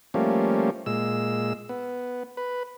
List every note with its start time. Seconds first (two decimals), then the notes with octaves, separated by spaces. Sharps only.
0.14 F3 G3 A3 A#3 C#4
0.86 A#2 G#3 E6
1.69 B3
2.37 B4